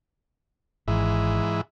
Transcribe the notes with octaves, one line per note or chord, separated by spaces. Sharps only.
G#1 G#2 E3